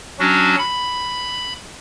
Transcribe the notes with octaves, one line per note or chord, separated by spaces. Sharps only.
F#3 C#4 D4 F#4
B5